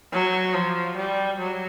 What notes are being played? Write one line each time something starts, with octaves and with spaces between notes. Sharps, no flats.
F#3
F3
G3
F#3